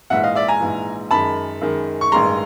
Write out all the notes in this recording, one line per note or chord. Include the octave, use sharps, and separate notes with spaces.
A#1 G#2 E3 E5 F#5
D#5 F5
D5 E5
G#5 A#5
A#1 G#2 E3
F#2 D#3 G#3 A5 B5
F#2 D#3 G#3
C#6
A1 G2 D#3 G#3 A#5 C6